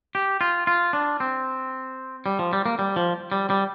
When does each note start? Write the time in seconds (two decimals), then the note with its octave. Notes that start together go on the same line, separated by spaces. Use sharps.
0.15 G4
0.41 F4
0.67 F4
0.93 D4
1.20 C4
2.26 G3
2.39 F3
2.53 G3
2.66 A#3
2.79 G3
2.96 F3
3.32 G3
3.50 G3